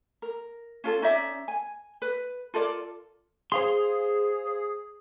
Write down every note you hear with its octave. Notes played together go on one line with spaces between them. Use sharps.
A#4
C#4 F4 A4
C#4 D#4 D5 E5
G#5
B4
F4 A4 A#4 D5
G#4 C5 F5 C6